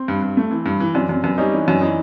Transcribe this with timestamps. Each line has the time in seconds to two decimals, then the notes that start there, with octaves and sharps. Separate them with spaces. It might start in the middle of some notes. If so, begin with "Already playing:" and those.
Already playing: C4
0.08 G2
0.23 G2
0.37 A3
0.51 E3
0.66 G2
0.80 E3
0.94 F#2 C4 D4
1.09 F#2 C4
1.24 F#2 B3
1.38 G3 C#4 D#4
1.52 E3 D4 E4
1.68 F#2
1.81 E3 C#4 D#4